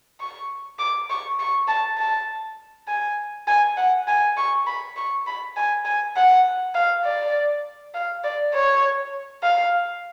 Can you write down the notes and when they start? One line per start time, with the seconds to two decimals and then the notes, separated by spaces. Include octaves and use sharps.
0.20 C#6
0.79 D6
1.10 C#6
1.39 C#6
1.68 A5
1.98 A5
2.88 G#5
3.47 G#5
3.77 F#5
4.08 G#5
4.37 C#6
4.67 B5
4.97 C#6
5.27 B5
5.57 G#5
5.85 G#5
6.16 F#5
6.75 F5
7.05 D5
7.95 F5
8.24 D5
8.55 C#5
9.43 F5